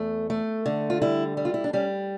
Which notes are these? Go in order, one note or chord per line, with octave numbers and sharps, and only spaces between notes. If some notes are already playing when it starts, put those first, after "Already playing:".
Already playing: E2 A3
A3
D3
F4
G3 E4
G3
F4
E4
D4
G3 C#4